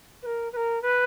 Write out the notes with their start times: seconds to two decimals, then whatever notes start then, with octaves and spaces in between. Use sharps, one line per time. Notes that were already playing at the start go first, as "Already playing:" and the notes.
0.22 B4
0.26 A#4
0.52 B4
0.56 A#4
0.82 B4